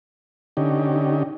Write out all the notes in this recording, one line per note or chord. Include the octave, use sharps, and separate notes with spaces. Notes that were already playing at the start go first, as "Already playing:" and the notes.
D3 C#4 D#4 G4